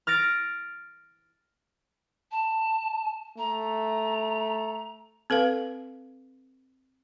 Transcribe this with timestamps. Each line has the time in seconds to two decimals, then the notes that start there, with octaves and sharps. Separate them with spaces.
0.07 F6 A6 A#6 D7
2.31 A5
3.38 A3 A#5
5.30 C4 A4 B4 F5